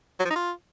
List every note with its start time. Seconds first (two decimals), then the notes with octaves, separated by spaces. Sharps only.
0.20 F#3
0.25 F3
0.30 D#4
0.36 F4